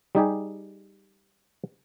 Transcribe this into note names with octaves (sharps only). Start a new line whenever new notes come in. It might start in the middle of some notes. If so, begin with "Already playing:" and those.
G3 D#4 G4 G#4